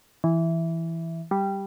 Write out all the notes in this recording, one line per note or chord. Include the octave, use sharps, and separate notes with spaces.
E3
G3